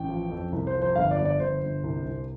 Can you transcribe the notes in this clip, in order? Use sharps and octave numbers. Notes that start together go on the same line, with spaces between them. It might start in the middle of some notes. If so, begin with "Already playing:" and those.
Already playing: A1 G5
F3
F2
C2
C5
F3
C5
G1 F5
D5
G1
D5
G1 C5
G1
C2
C2